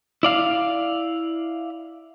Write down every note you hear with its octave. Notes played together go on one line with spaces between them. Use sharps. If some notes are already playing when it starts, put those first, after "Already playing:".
E4 D5 F5